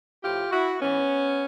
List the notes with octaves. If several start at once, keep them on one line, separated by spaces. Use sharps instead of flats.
A2 F3 F4 G4
E4 F#4
G#2 E3 B3 C#4